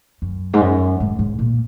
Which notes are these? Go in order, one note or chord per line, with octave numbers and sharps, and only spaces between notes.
F#2
G#2
F#2
G#2
G#2
A#2